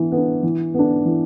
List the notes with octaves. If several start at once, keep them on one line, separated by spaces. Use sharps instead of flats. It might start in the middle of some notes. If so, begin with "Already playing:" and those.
Already playing: E3 B3 D4
B3
D4
E3
B3 D4
E3